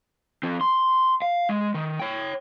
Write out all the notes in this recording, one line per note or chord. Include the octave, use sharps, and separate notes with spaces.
F3 C4
C6
F5
G#3
D#3
C#5 G5